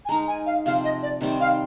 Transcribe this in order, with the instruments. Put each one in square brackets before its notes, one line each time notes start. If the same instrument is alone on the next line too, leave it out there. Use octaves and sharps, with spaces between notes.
[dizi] G#5
[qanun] G#3 D#4 A#4 [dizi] A#5
[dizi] G#5
F5
[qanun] C3 F3 C4 [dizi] F5
[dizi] D#5
D5
[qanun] C3 D#3 G3 C4
[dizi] F5